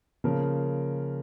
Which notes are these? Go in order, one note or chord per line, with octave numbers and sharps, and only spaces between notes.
C#3 F3 A#3 A#4